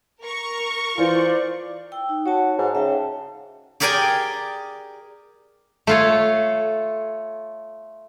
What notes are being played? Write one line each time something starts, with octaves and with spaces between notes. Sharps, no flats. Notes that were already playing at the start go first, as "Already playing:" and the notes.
A#4 C#6
E3 F4 C5 D5
G5 E6
D#4
F#4 C#5 A5
G#2
C#3 E5 G5 A5
G4 G#4 A#4 D5 G5 G#5
A3 F4 C#5